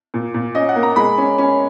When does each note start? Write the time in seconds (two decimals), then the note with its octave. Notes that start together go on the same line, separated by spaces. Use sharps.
0.14 A#2
0.34 A#2
0.55 C#4 D#5
0.69 F#5
0.76 A#3
0.83 A#5
0.96 G#3 B5
1.18 C#4
1.38 C#4